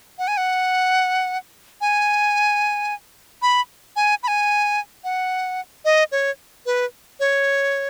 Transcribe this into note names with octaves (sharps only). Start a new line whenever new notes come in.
F#5
G#5
F#5
G#5
B5
G#5
B5
G#5
F#5
D#5
C#5
B4
C#5